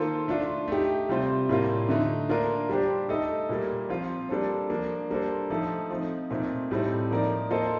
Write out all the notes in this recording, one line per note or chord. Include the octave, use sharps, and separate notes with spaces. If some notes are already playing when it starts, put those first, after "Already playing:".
Already playing: D#3 A#3 F4 A4 C5
A3 D4 F4
A3 D#4 G4
C3 G3 C4 F4 C5
A2 G3 A#3 F4
D3 A3 D#4
A#3 D4 F4 A#4
G3 D4 G4 C5
A3 D#4 A4 D#5
A#2 G3 A#3
F3 C4 F4
G3 A#3 D4 A4 C5
F3 A#3 D4
G3 A#3 D4 A4 C5
F3 A3 D#4 A4
F3 C4 D#4
A#2 A3 C4 D#4
A2 G3 C4 D#4 A4
F3 A#3 D#4 A#4 D5
A#3 F4 A4 C5 D#5